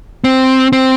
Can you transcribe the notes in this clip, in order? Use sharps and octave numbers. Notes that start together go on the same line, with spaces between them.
C4
C4